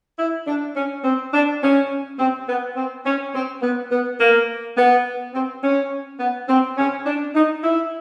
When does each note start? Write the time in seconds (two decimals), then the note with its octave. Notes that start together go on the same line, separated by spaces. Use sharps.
0.19 E4
0.47 D4
0.76 C#4
1.04 C4
1.33 D4
1.62 C#4
2.19 C4
2.48 B3
2.76 C4
3.06 C#4
3.34 C4
3.62 B3
3.91 B3
4.20 A#3
4.77 B3
5.34 C4
5.63 C#4
6.20 B3
6.49 C4
6.78 C#4
7.06 D4
7.35 D#4
7.63 E4